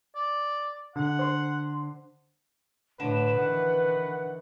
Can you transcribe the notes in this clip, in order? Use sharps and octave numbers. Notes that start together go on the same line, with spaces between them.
D5
D3 F#5
C5 C6
A2 D3 B4 E7
D#3 E3 F#5